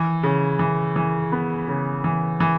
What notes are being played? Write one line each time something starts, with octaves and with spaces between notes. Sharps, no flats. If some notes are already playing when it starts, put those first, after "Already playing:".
Already playing: E3
C#3
E3
E3
B3
C#3
E3
E3